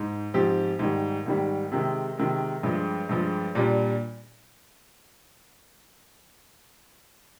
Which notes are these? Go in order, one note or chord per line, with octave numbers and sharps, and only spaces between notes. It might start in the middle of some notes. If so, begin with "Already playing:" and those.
Already playing: G#2
G#2 F3 C4 G4
G#2 D#3 G3
G#2 D#3 G3
C3 D#3 G#3
C3 D#3 G#3
G2 F3 G#3
G2 F3 G#3
A#2 G3 D4